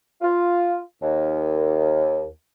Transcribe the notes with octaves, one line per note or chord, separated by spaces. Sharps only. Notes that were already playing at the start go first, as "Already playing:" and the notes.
F4
D#2